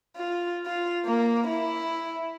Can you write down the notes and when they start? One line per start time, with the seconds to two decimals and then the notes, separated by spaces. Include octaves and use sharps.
0.16 F4
0.66 F4
1.05 A#3
1.47 E4